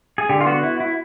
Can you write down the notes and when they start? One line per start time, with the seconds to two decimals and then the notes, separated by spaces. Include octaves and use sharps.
0.18 G#4
0.29 D3 G4
0.41 F4
0.46 B3 F#4
0.63 E4
0.80 E4